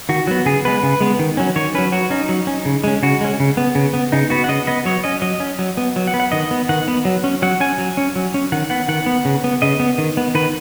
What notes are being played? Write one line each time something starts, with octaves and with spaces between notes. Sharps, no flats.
D#3 F#4
F#3 B3 F#4
C#3 G#4
G#3 B3 B4
C#3
G#3 B3
D#3
F#3 C#4
D#3 C#5
F#3 C#4 B4
F#3 F#4
C#4 D#4
F#3
C#4
C#3
G#3 C#4
C#3 F#4
G#3 C#4
C#3
B3
C#3
B3
C#3 D#4
B3 F#4
F#5
C#3 D#5
B3 D#5
F#3 C#5
C#4 D#5
F#3 D#5
C#4
F#3
B3
F#3
F#5
B3
F#5
D#3 D#5
B3
D#3 F#5
B3
F#3
C#4
F#3 F#5
C#4 G#5
F#3
C#4
F#3
C#4
D#3 F#5
B3 F#5
D#3 F#5
B3
C#3
B3
C#3 D#5
B3
D#3
B3
D#3 B4